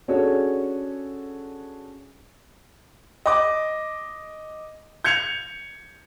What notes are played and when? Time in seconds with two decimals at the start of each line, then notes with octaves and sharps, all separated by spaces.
0.08 C#4 D4 F#4 G#4 A4 C#5
3.26 D#5 D6
5.04 G6 G#6 C#7 F7